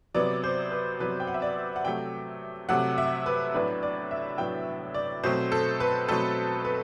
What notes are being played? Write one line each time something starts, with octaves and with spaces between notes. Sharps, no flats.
C3 F#3 B3 D5
C5
B4
C3 F#3 B3 B4
G5
F#5
E5
D5
F#5
C3 F#3 A3 G5
C3 F#3 A3 F#5
E5
B4
A2 F#3 B3 D4 B4
D5
E5
A2 F#3 B3 D4 G5
D5
B2 F#3 A3 C4 C5
A4
B4
B2 F#3 A3 C4 A4
B4